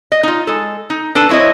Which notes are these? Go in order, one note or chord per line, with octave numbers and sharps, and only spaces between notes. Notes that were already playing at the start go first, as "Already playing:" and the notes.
D#5
D#4 F4
G#3 A4
D#4
D4 A4 B4 A5
F#3 C4 E4 C#5 D#5